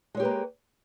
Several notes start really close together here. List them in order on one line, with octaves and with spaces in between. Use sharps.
G#3 C#5 G4 B4 A#3